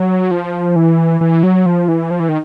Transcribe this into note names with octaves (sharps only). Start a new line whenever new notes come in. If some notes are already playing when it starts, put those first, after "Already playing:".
Already playing: F#3
F3
E3
E3
F#3
F3
E3
F3
E3
D#3